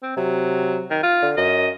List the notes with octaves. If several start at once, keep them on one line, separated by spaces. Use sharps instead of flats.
C4
C3 F#3
D#3
F4
D3
F#2 D#5